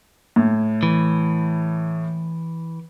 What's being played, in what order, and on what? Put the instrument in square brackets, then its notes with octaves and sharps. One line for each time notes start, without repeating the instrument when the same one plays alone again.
[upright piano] A2
[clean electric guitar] E3